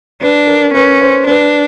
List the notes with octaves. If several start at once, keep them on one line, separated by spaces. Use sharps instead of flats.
D4 B4
A#4
C#4 B4
C5
D4 B4